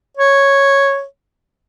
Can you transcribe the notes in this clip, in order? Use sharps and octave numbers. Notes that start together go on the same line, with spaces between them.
C#5